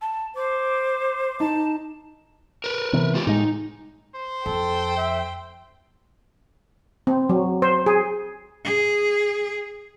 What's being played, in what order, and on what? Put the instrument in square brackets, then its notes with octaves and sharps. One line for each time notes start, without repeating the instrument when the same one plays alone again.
[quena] A5
[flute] C5 [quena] D6
[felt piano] D#4 [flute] A5
[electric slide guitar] A#4 B4
[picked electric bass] C3 E3 B3
[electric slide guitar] G#3 F4 G4
[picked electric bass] A2 G#3 [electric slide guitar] D#4
[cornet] C5
[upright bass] F2 [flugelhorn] A4 [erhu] G5
[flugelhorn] E5
[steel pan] C4
F#3
C5
G#4
[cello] G#4